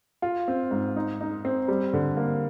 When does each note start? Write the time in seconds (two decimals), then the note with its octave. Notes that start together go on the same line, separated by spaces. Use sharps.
0.22 F4
0.48 C4
0.71 G#2
0.96 D#4
1.21 D#4
1.45 C4
1.68 G3
1.93 D3
2.17 A#3